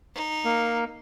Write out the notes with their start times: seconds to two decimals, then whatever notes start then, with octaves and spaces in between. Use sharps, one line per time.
0.14 D#4
0.45 A#3